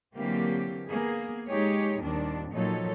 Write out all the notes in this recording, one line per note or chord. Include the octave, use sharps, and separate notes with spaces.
D3 E3 F#3 A#3 C4 G4
A#3 B3 G#4
G#3 D#4 G4 G#4 C#5
D#2 A#2 D#3 G3 C4 D4
A#2 F3 F#3 D#4 A4 C#5